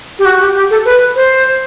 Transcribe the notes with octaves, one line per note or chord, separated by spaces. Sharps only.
G4
F#4
G4
G4
A4
B4
C5